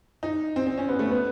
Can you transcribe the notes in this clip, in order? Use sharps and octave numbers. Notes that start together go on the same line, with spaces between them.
D#4
C4
C4
C#4
B3
A3
B3